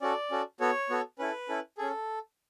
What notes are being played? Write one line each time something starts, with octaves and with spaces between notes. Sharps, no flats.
C#4 F#4 A4 D5
C#4 F#4 A4
B3 F#4 A4 C#5
B3 F#4 A4
C#4 E4 A4 B4
C#4 E4 A4
C#4 G#4 A4